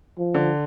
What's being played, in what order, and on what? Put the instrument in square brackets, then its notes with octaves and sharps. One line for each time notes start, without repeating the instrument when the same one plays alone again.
[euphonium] F3
[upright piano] D3